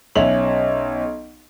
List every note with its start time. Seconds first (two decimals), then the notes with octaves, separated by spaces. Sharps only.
0.15 B1 C#4 E5 F7 F#7